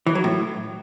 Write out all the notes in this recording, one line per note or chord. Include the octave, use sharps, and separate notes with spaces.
E3
F#3
A2